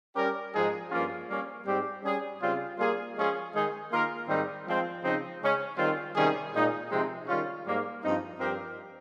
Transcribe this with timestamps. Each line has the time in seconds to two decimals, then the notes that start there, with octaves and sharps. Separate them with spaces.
0.16 G3 C#4 G4 A#4
0.53 G#2 F3 G#3 D#4 G#4
0.91 G2 F3 A#3 C#4 F4
1.28 G3 A#3 C#4
1.66 G#2 G3 C4 G4
2.03 G3 C#4 G#4
2.41 C#3 G3 C4 F4
2.78 G3 A#3 F4 G#4
3.16 F3 G#3 C#4 F4 G#4
3.53 D#3 G#3 D#4 G#4
3.91 D#3 A#3 F4 A#4
4.28 G#2 D#3 G3 C4 D#4
4.66 F3 G#3 C4
5.03 C#3 F3 C4 D#4
5.41 C#3 G#3 C#4
5.78 D#3 G3 C4 F4
6.15 C3 D#3 G3 C#4 G#4
6.53 A#2 G#3 D#4
6.90 C3 F3 G#3 C4 D#4
7.28 D#3 G3 C#4 F4
7.65 G#2 G3 A#3
8.03 G2 F3 C4 D#4
8.40 G2 F3 C4 G4 A#4